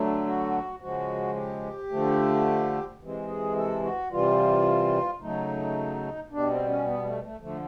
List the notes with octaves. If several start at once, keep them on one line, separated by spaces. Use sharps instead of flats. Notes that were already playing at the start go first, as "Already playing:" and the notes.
Already playing: D3 F#3 A3
F#4
C#3 F3 G#3 F#4
G4
D3 F3 A3
C3 E3 G#3
G#4
A4
F#4
C3 E3 G3 F4
C#3 F#3 A3 D#4
B2 G3 D4
C4
C#4
B3
A3
A3
D3 F3 A3